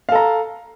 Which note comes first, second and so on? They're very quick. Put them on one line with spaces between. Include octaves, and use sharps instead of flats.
F5 A4 A#5